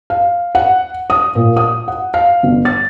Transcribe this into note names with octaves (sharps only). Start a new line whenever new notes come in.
F5
F#5
D#6
A#2
D#6
F#5
F5
G1
A6